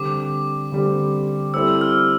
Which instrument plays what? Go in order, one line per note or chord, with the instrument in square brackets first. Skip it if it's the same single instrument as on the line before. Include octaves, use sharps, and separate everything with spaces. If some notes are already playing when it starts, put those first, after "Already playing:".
Already playing: [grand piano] D3 G3 C4 [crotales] D6
[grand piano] D3 G3 C4
[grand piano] G3 C4 E4 A4 C5 [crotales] E6
[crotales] F6